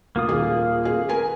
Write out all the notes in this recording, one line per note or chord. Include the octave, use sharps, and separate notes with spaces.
A#3 F4 D#6
D#1 G#4
G#4
A#4 B4 G#5